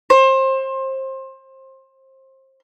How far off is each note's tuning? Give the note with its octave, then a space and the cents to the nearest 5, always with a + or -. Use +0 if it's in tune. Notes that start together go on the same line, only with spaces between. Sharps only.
C5 +25